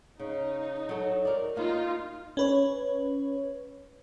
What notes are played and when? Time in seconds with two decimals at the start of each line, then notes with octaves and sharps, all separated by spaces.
0.19 C#3 D#4
0.89 F#3 A4
1.25 A#4 D5
1.56 A#3 D#4 F4 F5
2.37 C#4 B4 C#5